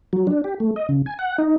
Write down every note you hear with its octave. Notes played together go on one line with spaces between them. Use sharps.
F#3
D4
G4
A3
D#5
C#3
G#5
F#5
D#4